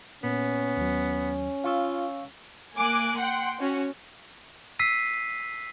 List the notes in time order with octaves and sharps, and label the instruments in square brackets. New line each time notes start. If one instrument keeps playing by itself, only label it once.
[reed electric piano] A#2 A#3 [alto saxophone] B3 [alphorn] C#4
[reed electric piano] D#2 F#3
[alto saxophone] F4 [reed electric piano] F5 C#6 E6
[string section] A#3 G#5 D6 F#6
F#5 G5 C6
C#4 F#4
[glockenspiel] E6 B6 C7 D#7